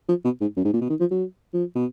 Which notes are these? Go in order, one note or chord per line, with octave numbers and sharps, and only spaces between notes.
F3
B2
G#2
F#2
G#2
A#2
B2
D#3
F3
F#3
F3
B2